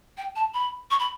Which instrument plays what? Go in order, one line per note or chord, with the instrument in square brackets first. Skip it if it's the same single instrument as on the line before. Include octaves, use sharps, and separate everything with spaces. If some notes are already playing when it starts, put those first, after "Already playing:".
[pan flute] G5
A5
B5
C#6
B5